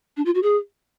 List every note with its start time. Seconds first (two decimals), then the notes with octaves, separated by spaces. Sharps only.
0.17 D4
0.25 F4
0.35 F#4
0.43 G#4